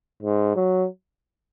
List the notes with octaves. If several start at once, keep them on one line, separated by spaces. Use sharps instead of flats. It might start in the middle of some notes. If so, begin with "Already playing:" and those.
G#2
F#3